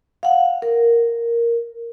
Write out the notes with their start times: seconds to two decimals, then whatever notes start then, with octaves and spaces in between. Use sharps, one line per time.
0.23 F5 F#5
0.62 A#4